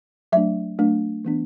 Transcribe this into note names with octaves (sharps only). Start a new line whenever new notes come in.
F#3 A3 D4 E5
F#3 A3 D4
E3 B3 D4